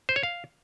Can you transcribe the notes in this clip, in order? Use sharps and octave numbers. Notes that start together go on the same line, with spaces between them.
C5
C#5
F5